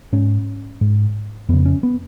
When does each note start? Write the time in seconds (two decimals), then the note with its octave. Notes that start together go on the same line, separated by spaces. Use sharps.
0.12 G#2 C#4
0.81 G#2
1.49 F2 C#3 B3
1.66 C#4
1.83 B3